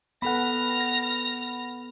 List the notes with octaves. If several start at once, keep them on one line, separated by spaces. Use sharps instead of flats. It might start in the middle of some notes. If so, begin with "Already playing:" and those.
B3 A4 F#5 B5 F6 A#6